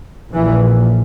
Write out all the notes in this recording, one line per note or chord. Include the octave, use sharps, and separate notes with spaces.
A#1 A#2 E3